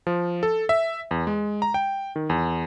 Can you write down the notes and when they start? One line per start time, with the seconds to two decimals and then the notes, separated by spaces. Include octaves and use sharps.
0.07 F3
0.43 A4
0.69 E5
1.11 E2
1.27 G#3
1.62 A#5
1.74 G5
2.16 D#3
2.30 E2